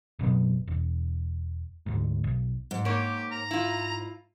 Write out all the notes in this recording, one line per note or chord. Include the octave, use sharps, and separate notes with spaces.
F#1 B2 F#3 B3
E1
D2 G#2
B1
G#2
A#3 G4 C#5
A#5
E4 F4